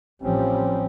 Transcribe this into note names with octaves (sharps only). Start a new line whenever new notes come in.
A1 F3 G3 C4 C#4